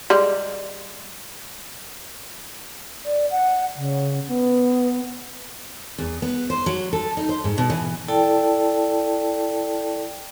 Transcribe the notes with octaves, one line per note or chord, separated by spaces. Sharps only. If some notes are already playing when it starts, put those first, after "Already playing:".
G3 G#3
D5
F#5
C#3
B3
E2
B3
C5
F#3
A4
D#4
C5
G#2
B2
E3
E4 A4 D5 G5 A5